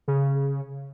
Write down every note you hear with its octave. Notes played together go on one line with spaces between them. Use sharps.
C#3